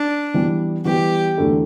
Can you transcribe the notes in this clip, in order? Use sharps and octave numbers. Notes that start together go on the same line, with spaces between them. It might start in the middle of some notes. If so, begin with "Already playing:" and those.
Already playing: D4
E3 G3 B3
E3 G3 B3 G4
E2 D3 F#3 A3 E4